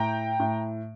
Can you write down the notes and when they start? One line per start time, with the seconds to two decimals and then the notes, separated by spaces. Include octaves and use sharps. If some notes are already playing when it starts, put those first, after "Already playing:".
Already playing: A2 G5 A#5
0.40 A2